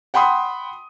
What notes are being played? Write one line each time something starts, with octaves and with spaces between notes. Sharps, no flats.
F#5 G5 B5 C6 D#6